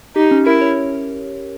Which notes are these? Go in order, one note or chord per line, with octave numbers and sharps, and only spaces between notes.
D#4 G4
C#4
E4 A#4
C#5